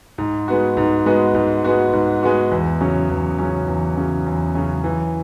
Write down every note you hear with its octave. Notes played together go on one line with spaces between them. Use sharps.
G#2
G#3 B3 F#4
G#2
G#3 B3 F#4
G#2
G#3 B3 F#4
G#2
G#3 B3 F#4
E2
C#3 F#3 C#4
E2
C#3 F#3 C#4
E2
C#3 F#3 C#4
E2
C#3 F#3 C#4
E3